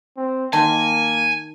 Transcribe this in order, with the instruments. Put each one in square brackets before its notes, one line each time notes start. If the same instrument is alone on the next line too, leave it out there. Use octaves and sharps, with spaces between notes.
[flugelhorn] C4
[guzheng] D#3 C6 [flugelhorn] A#3 [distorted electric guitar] G#5 [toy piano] A5